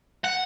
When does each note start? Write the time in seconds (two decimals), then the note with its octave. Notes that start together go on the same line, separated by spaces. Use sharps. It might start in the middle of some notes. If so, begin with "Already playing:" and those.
0.25 F#5